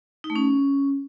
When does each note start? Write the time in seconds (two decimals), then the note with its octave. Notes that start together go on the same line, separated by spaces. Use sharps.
0.24 D#4
0.30 A3
0.36 C#4